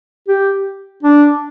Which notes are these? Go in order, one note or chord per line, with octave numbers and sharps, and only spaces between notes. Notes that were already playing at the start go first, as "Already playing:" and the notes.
G4
D4